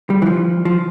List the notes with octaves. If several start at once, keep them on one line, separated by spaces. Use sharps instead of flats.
G3
E3
F3
F3